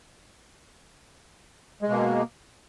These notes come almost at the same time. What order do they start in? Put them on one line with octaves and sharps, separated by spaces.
G#3 B2 A#3